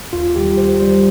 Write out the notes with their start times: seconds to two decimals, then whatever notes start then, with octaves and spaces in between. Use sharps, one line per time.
0.13 D#2 F4
0.36 D#3 G3 G4
0.57 D#2 C5
0.80 D#3 G3 C5